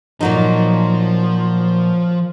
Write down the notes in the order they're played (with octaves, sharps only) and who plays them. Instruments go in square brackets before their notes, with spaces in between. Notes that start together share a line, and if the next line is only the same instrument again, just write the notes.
[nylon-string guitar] A#2 F#3 D#4 [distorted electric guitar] F3